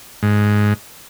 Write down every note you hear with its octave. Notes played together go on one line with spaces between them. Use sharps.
G#2